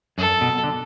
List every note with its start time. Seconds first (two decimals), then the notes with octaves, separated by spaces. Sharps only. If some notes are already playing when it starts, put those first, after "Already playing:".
0.18 F#2 A4
0.41 B2
0.64 D3